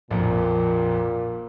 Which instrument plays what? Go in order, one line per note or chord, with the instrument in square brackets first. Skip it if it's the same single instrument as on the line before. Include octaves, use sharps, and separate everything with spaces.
[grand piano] A#1 F2 [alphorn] A#2